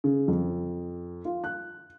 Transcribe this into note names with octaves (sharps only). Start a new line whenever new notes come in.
C#3
F2
F4
F#6